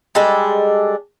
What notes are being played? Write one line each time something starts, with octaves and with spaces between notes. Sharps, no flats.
G3 G#3 D4 A4